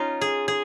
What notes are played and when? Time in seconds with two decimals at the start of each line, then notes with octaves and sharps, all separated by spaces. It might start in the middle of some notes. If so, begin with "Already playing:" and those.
Already playing: C#4 D#4 F4
0.21 G#4
0.48 G#4